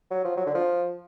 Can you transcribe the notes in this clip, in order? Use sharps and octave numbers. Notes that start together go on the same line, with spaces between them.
F#3
F3
F#3
D3
F3